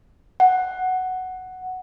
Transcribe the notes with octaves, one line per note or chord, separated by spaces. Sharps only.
F#5